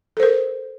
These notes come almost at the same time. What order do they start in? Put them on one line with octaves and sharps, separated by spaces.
A4 C5 A#4